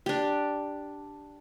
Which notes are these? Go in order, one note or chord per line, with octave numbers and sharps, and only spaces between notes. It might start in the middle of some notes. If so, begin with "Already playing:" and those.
D4 G4